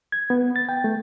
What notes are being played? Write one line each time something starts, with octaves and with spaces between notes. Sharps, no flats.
G#6
B3
A6
G5
A3